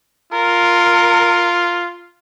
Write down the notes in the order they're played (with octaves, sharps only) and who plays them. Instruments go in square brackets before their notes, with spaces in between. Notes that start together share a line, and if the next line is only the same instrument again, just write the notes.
[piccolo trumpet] F4 [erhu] A#4